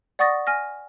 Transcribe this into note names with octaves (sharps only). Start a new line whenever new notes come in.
D5 F#5 C#6 D#6 A6 A#6
G#5 F6 A#6